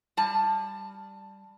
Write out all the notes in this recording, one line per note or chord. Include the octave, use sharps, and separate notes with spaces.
G3 A5